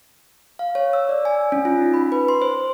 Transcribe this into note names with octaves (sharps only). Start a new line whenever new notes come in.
F5
C#5
E6
D5
G#5
C#4
F4
D#4
B5
B4
C6
C5